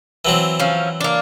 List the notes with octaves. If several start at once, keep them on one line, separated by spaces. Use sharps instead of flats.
E3 F#3 C4
F3 C#4
A#3 D4